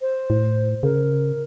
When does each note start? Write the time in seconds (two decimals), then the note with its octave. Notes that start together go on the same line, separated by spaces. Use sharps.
0.01 C5
0.30 A2
0.83 C#3 A#4